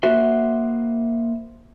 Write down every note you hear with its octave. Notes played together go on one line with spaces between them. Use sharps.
A#3 F#4 C5 E5 F#5